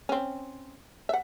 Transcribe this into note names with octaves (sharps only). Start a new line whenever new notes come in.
C4 C#4
E5 F#5